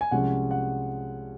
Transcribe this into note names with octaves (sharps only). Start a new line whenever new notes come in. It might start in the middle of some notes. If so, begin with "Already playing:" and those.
G#5
C2 C3 F3 G#3 C#4 F#5
F#5